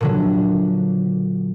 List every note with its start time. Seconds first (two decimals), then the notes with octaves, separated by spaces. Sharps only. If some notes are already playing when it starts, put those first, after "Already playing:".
0.01 A#2 D3 F#3